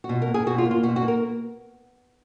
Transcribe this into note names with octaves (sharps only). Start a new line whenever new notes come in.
F#4
B2 F4
A#4
A#3
G#4
B2 F#4
F4
A#3
F4
B2 F#4
F#4
A#3
A#4